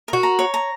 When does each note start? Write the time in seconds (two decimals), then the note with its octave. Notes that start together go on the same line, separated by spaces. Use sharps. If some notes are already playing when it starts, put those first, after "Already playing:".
0.08 A#4
0.13 F#4
0.23 A#5
0.39 C#5
0.54 A#5